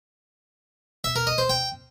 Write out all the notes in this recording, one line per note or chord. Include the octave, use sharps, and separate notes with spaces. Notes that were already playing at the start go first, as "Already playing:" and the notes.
E5
A#4
D#5
C5
G5